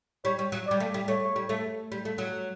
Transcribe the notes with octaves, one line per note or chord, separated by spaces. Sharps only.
G3 C#5
G3
F#3
G3 D5
A3
G3
A3 C#5
G3
A3
G3
A3
F#3